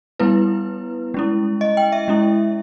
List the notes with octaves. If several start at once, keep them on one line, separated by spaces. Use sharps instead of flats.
G3 B3 E4 B4
G#3 C#4 E4
D#5
G5
E5
G#3 C#4 E4